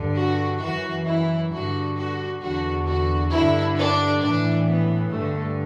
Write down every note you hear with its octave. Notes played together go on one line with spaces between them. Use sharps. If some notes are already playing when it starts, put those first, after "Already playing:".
Already playing: G2 D3
F#4
F#2 E3 F#4
E4
G2 D3 F#4
F#4
E2 D3 F#4
F#4
G2 D3 E4
D4
A2 E3 D4
B3
G2 D3 A3